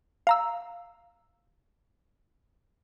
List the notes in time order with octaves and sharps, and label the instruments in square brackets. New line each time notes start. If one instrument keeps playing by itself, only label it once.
[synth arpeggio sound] F5 A#5 E6